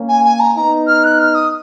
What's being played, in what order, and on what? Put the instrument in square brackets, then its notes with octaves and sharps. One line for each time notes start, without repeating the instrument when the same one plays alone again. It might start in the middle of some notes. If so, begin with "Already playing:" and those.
Already playing: [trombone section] A#3 C#4
[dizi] G#5
G#5
A#5
[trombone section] B3 D#4 [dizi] A#5
[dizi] F6
F#6
F6
D#6